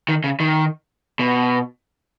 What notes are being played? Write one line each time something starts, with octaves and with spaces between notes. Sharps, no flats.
D#3
C#3
D#3
B2